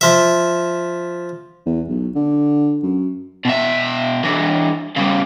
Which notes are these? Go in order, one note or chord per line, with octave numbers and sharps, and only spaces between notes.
F3 E5
E2
B1
D3
F#2
B2 E5
E3 D4
C#3 G3